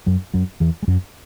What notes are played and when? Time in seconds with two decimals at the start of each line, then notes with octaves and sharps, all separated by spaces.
0.06 F#2 F#3
0.34 F#2 F#3
0.60 E2 E3
0.83 G#3
0.88 F#2 F#3